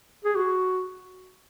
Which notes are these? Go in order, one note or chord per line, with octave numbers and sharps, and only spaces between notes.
G#4
F#4